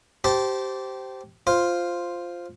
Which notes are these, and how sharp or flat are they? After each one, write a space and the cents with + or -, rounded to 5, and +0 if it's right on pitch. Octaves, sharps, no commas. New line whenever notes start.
G4 -20 C5 -5 A5 +0
F4 +0 C5 +0